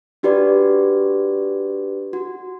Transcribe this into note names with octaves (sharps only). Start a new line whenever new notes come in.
D4 F#4 G4 B4 D5
F#4